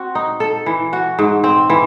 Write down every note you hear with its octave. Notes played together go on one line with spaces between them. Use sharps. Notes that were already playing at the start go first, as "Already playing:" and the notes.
Already playing: C4 F#4
D#4
A4
E3
F#4
G#2
C4
E3